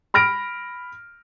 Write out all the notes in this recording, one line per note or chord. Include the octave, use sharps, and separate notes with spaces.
B5 F6 A#6 D7